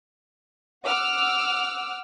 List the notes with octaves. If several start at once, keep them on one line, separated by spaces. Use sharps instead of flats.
F#5 D6 E6 F6